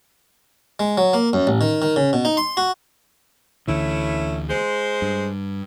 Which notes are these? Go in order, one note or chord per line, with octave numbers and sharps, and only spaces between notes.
G#3
F#3
A#3
F#2
A1
D#3
D#3
C#3
B2
D#4
C6
F#4
D2 D3 E3 A3 C#4 E4
G#3 C5
G2